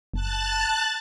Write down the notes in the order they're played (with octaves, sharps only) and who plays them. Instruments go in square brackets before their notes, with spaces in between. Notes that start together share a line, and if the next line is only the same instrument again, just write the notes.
[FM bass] F#1 [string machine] A5 F#6 A6